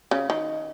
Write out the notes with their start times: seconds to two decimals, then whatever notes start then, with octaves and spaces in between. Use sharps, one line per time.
0.11 C#3
0.30 D#3